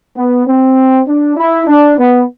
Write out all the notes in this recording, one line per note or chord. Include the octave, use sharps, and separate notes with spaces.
B3
C4
D4
E4
D4
B3